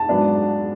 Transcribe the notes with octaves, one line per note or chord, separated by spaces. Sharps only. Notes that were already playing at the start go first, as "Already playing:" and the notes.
Already playing: A5
G#2 F#3 B3 D4